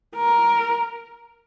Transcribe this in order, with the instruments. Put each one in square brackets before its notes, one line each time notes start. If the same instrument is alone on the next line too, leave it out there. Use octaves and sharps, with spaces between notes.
[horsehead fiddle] A#4